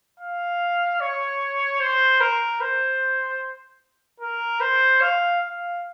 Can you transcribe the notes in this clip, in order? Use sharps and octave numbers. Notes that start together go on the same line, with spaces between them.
F5
C#5
C5
A#4
C5
A#4
C5
F5
F5